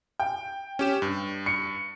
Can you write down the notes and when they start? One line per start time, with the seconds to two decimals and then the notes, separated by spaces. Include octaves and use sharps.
0.20 G5
0.79 C#4 G4 E7
1.02 G2
1.46 C#7